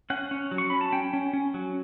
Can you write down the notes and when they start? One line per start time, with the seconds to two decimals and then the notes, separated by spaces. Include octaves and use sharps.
0.10 C#4 F#5
0.31 C#4
0.51 F#3
0.58 C#6
0.70 C#4 B5
0.81 A5
0.93 C#4 G5
1.13 C#4
1.33 C#4
1.54 F#3